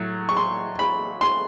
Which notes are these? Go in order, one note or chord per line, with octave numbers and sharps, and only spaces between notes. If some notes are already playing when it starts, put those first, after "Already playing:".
Already playing: A2 F#3
C#6
C6
B5
C6